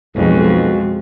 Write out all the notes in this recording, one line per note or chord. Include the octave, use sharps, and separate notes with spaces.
B1 F2 F3 G#3 F#4